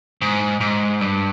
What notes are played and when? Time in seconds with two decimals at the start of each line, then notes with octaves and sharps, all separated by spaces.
0.22 G#2
0.61 G#2
1.01 G2